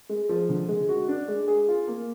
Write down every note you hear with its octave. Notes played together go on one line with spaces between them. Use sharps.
G#3
F3
D3
G#3
F#4
D4
G#3
G#4
F4
A#3